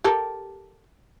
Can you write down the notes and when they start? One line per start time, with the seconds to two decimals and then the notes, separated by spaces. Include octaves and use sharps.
0.04 G4 A4 A#4